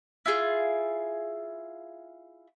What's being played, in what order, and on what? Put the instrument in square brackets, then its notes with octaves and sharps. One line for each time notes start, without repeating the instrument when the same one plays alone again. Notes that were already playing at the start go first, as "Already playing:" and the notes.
[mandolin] E4 F4 G#4